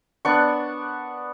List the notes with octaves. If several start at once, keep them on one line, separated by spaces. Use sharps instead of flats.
B3 D4 C#6